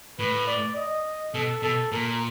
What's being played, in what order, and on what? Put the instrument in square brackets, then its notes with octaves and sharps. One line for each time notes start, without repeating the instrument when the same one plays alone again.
[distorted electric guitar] A2 [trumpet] B4
[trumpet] D5
D#5
[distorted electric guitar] B2 [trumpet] A4
[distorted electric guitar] B2 [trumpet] A4
[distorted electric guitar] A#2 [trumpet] A#4